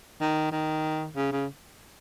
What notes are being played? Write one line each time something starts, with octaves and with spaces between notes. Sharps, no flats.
D#3
D#3
C#3
C#3